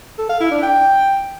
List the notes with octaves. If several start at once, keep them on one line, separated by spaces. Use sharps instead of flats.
A4
F5
E4
D4
G5